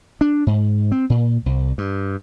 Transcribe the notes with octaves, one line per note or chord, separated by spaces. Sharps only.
D4
G#2
C4
A#2
C2
G2